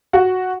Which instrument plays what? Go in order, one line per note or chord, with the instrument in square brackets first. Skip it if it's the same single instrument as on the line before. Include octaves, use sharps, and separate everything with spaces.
[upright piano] F#4 F#5